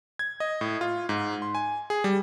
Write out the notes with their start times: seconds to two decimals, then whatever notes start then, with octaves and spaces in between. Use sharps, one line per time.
0.19 G#6
0.40 D#5
0.61 A2
0.81 F4
1.09 G#2
1.42 C6
1.55 G#5
1.90 G#4
2.04 G3